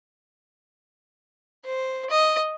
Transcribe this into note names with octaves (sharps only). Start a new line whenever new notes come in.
C5
D#5